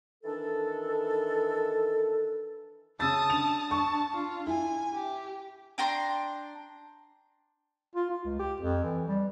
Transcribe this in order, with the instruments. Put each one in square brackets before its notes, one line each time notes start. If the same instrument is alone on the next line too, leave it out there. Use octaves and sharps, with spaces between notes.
[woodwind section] D#3 E3 D4 A4
[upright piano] C#3 E6 A6 [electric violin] A5 D#6
[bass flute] D4 [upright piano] F7
[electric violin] A5 [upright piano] C#6
[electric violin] F4
[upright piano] E4 [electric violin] G#5
[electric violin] G4
[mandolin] D4 G5 A#5 C6
[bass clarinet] F4
F4
C#2
G4
F2
E3
G3